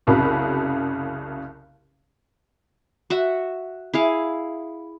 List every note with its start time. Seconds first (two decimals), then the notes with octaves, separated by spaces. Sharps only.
0.07 F#1 C2 C#3 F#3 B5
3.10 F#4 E5 F#5
3.94 E4 G#4 F5